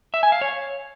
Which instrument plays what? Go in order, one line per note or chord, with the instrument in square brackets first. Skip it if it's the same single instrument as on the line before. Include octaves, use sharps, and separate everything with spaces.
[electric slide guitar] E5
G#5
F5
C#5